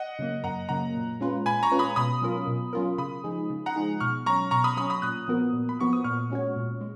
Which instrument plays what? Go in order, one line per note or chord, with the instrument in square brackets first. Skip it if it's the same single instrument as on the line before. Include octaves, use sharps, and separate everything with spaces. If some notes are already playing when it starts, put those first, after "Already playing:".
Already playing: [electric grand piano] D#5 F#5
[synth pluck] C#3 F#3 A#3
[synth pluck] F#2 [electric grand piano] F#5 A#5
[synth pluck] C#3 F#3 A#3 [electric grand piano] F#5 A#5
[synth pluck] A#2
G#3 C#4 F4 B4
[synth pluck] A#2 [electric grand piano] G#5 B5
[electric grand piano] A#5 C#6
[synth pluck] G#3 C#4 F4 B4
[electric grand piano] B5 D#6
[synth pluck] B2 [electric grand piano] B5 D#6
[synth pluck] F#3 C#4 F4 A#4
B2
F#3 C#4 F4 A#4
[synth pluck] C#3 [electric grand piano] B5 D#6
[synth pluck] F3 G#3 D#4 G#4
C#3
[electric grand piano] F#5 A#5
[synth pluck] F3 G#3 D#4 G#4
[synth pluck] B2 [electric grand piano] C#6 F6
[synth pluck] F#3 C#4 [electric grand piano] A#5 C#6
[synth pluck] B2 [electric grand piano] A#5 C#6
[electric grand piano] B5 D#6
[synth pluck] F#3 C#4 [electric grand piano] B5 D#6
[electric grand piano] B5 D#6
[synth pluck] A#2 [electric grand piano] D#6 F#6
[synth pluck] F3 B3 F#4 A#4
A#2
[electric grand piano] B5
[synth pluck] F3 B3 F#4 A#4 [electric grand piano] C#6
[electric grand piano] D#6
[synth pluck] A#2 [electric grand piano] C#6 F6
[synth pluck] G#3 C#4 F#4 C#5
A#2
G#3